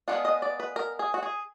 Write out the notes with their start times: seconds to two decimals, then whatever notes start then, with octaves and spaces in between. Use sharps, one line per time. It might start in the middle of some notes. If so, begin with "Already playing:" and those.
0.08 G#3 B3 D4 F4 F#5
0.25 D#5
0.42 D5
0.60 B4
0.76 A#4
0.99 G#4
1.14 F#4
1.23 G#4